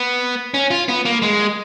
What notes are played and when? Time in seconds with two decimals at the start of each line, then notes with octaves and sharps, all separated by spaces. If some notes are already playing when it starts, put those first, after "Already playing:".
Already playing: B3
0.54 C#4
0.71 F4
0.88 B3
1.05 A#3
1.22 G#3